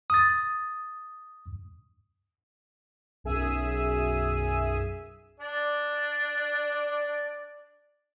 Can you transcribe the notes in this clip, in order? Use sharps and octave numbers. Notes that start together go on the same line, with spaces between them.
D#6 A6
B1 F#2 G#4 E5 E6 D#7
D4 D5